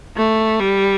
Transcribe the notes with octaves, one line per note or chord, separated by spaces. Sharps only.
A3
G3